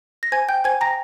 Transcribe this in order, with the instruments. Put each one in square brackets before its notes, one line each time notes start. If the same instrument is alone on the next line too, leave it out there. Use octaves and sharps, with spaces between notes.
[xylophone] A#6
C5 G#5 G#6
G5 G6
C5 G#5 G#6
G5 A#5 A#6